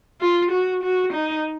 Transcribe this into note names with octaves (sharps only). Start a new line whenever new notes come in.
F4
F#4
F#4
D#4